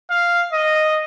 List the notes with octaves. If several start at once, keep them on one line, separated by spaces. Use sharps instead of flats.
F5
D#5